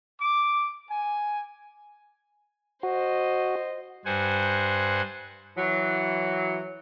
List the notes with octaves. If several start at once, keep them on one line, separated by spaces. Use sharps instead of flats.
D6
G#5
F#4 C5 D#5
G2 C5 F#5 G#5
E3 F#3